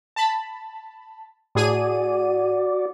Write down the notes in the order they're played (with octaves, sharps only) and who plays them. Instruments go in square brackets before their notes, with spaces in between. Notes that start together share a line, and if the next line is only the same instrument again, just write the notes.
[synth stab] A5 B5
[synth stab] A2 G#4 D#7 [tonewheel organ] F#4 D5